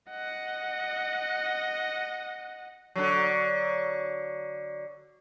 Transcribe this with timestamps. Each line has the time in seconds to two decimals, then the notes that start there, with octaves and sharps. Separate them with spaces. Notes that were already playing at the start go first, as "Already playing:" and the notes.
0.10 D#5 F#5
2.95 D3 F#3